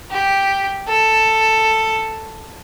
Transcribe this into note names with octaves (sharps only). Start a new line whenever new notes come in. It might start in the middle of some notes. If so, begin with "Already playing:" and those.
G4
A4